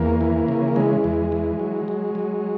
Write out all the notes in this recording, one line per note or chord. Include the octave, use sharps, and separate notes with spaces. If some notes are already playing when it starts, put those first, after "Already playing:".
Already playing: E2 A#3
E3
C#3
E3 G#3
E2
E3
F#3
F#3
F#3